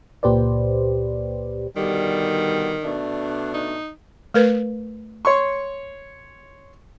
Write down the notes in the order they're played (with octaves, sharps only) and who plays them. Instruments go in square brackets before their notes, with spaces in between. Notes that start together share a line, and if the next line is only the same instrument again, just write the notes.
[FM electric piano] C#2 A#2 G4 B4 C5 D5
[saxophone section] B2 D3 G3 [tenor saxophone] D#3
[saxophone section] B2 A3 D4
[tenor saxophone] D#4
[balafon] A3 A#4 B4
[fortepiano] C#5 C6 C#6